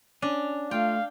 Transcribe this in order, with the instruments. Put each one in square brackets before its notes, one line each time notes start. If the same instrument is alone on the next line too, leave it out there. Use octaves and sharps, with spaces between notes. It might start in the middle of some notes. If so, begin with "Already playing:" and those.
[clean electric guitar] C#4 [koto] D4
[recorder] A3 [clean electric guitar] F4 [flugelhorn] F5 [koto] G5